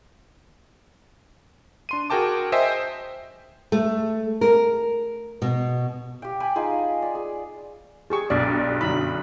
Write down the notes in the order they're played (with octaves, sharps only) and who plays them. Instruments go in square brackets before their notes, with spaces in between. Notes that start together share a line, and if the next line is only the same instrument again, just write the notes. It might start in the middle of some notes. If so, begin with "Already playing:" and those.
[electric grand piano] D4 C6 D#7
F#4 G#4 A#4 G5 A5 D6
C5 D#5 E5 G5 G#5
[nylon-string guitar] A3
A#4
B2
[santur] G4 G5
G5 G#5 B5
D#4 F4 G#4
D5
G#4
[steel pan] G4 G#4 C#6
[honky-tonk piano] B1 G2 [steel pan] D5
[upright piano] F#2 D3 [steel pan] B5